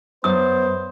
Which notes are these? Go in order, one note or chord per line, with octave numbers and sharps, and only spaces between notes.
F#2 B3 C5 D#6